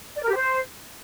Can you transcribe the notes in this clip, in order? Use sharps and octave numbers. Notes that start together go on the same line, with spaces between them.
D5
A#4
G4
C5